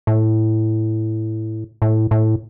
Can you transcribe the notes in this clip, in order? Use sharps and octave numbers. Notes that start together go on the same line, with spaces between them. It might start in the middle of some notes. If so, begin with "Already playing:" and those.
A2
A2
A2